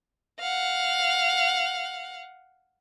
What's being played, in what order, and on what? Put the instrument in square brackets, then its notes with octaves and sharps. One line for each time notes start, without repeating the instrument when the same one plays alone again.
[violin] F5 F#5